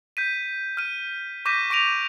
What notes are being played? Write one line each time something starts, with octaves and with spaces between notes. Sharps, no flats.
G6 B6 D#7
F6 D#7
C#6 D6 G6 A#6 B6 D#7
C#6 A#6 D7 D#7 F7